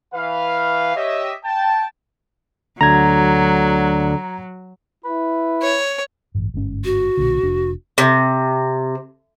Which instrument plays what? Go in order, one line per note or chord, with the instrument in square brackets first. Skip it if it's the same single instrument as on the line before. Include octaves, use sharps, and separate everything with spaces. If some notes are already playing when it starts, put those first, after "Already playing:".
[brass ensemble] E3 B4 F5
G4 C#5 D#5 E5
G5 A5
[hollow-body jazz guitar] D2 [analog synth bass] D3 [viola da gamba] F#3 [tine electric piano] A#5 G#6
[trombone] E4 [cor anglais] B4
[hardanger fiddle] C#5
[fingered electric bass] A1 G2
G1 G#2 C#4
[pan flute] F#4
[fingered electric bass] B1 A#2 D3
F1 D4
[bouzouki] C3